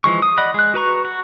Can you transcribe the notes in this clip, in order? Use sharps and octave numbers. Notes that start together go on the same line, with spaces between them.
E3 F3 G#3 C#6
D#6
D5 D#5 F#5 B5
G#3 F#6
F#4 B4 A#5 C#6
F#4